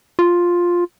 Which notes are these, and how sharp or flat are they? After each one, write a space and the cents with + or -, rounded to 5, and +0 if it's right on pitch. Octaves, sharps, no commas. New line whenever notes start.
F4 +5